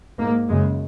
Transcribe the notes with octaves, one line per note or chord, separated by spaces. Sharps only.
G#2 A#3
F#2 C#3 G#3